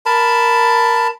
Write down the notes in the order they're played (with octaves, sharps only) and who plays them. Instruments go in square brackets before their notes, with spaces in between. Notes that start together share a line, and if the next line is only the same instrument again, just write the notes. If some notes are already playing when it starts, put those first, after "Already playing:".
[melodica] A#4 A5 B5